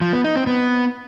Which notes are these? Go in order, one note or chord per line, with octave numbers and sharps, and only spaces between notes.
F3
B3
D#4
C4
B3